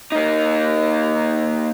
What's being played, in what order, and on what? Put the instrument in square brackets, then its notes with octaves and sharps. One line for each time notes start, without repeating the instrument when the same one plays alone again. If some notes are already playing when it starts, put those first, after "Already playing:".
[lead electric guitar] A#3 D#4